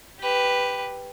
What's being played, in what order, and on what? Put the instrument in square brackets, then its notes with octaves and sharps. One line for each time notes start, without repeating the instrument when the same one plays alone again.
[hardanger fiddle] G4 B4